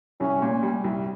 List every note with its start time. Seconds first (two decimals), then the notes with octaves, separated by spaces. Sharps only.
0.20 C2 C#4
0.42 A#2
0.63 G3
0.84 C2